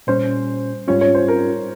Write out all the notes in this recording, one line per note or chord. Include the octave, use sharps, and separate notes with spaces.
A#2 G3 C#4 C5
G#2 G3 C#4 F4 C#5
C#5
C5
A#4